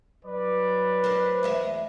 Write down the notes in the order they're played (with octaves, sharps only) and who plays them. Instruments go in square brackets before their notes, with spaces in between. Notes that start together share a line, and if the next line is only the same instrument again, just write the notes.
[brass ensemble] F#3 D5 [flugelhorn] B4
[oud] D4 A#4 C5
E2 G#3 E5